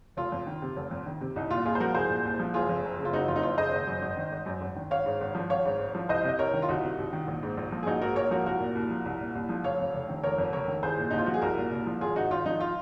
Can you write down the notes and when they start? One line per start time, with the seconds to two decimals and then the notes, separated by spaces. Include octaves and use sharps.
0.17 F1 F4
0.32 F2
0.47 D#3
0.62 C3
0.76 F1
0.91 F2
1.06 D#3
1.21 C3
1.36 C2 D#4
1.50 A#2 F4
1.65 C2 F4 G#4
1.75 C5
1.80 F3 F#4 A#4
1.95 C2 G#4 C5
2.10 A#2
2.25 C2
2.39 F3
2.54 F#1 F4 G#4
2.69 F2
2.84 F#1
2.99 C#3
3.05 F4
3.13 F#1 D#4 F#4
3.28 F2 F4
3.36 D#4
3.43 F#1 F4
3.57 C#3 C5 D#5
3.72 G#1
3.87 F#2
4.02 G#1
4.17 D#3
4.32 G#1
4.46 F#2
4.61 G#1
4.76 D#3
4.91 G#1 C#5 F5
5.06 G#2
5.21 G#1
5.35 F3
5.50 G#1 C#5 F5
5.65 G#2
5.80 G#1
5.95 F3
6.09 C2 C5 D#5
6.24 C3 D#5
6.39 C2 A#4 C#5
6.54 D#3
6.62 F4
6.68 C2 D#4 F#4
6.83 C3
6.98 C2
7.13 D#3
7.28 A#1
7.43 G#2
7.57 A#1
7.72 F3
7.83 G#4
7.87 A#1 D#4 F#4
8.01 G#2 F#4 A#4
8.16 A#1 A#4 C#5
8.31 F3 F#4 A#4
8.46 C2 F#4 A#4
8.60 A#2
8.75 C2
8.90 F3
9.05 C2
9.20 A#2
9.35 C2
9.49 F3
9.64 F1 C#5 F5
9.80 F2
9.94 F1
10.09 D#3
10.24 F1 A#4 C#5
10.38 F2
10.53 F1 A#4 C#5
10.68 D#3
10.83 C2 G#4 C5
10.98 A#2
11.11 C2 D#4
11.18 F4
11.26 F3 F#4
11.34 G#4
11.42 C2 F#4 A#4
11.57 A#2
11.71 C2
11.86 F3
12.01 G#1 F4 G#4
12.16 G#2 D#4 F#4
12.31 G#1 F4
12.46 F3 D#4
12.60 F4